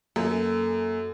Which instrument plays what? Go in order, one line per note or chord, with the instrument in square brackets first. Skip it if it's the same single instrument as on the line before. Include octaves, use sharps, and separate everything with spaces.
[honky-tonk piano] F#2 [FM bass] A#3 [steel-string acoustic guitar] A4 G#5